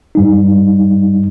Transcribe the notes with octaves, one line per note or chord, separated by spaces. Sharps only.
G2 G3 D#4